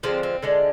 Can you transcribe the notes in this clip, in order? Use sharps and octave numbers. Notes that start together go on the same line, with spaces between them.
D3 F3 G#3 C4
C4
D3 F3 G#3 D4